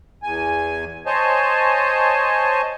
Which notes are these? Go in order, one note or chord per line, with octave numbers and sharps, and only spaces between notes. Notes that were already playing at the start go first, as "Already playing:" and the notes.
E2 G#5
C5 C#5 D#5 G#5 A5